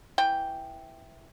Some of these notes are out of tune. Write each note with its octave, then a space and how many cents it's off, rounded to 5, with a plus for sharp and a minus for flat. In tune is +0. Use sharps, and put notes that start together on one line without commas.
E3 +0 G5 +0